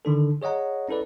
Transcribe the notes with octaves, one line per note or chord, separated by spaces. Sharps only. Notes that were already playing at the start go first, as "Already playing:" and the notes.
D3 D#3 D4 A4
G#4 C#5 D#5 F#5 A#5
C#4 E4 A4 B4 D5